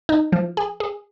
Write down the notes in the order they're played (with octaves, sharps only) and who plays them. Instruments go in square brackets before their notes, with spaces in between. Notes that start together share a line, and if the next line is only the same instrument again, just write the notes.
[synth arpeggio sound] D#4
F3
G#4
G#4